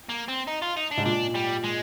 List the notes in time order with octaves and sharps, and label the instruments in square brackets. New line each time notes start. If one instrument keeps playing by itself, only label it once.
[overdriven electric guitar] A#3
C4
D#4
F4
D#4
D4
[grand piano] G#2
[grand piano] A#2 [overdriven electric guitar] D4
[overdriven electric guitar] G3
G#3